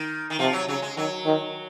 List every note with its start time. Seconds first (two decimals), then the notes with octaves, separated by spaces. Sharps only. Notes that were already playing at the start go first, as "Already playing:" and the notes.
Already playing: D#3
0.30 D#3
0.39 C3 F3
0.53 F#3
0.68 C#3 F#3
0.82 G#3
0.97 D#3 F#3
1.26 D#3